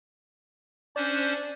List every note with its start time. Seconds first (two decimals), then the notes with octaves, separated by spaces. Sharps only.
0.96 C#4 D4 C5 D5